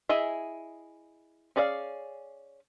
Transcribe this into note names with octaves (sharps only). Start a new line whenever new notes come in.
E4 G#4 D#5 E5
C#4 G#4 D5 D#5 F5